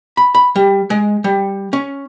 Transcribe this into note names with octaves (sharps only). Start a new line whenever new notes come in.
B5
B5
G3
G#3
G3
C#4